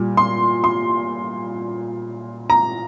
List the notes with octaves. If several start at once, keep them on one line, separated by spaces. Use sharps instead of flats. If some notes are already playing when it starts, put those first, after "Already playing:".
Already playing: A#2 G3
C6
C6
A#5